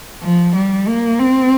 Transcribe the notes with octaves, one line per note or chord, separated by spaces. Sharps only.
F3
G3
A#3
C4